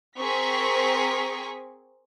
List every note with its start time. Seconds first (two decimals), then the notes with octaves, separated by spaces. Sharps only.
0.19 C4 G#4 A#4 C#6 B6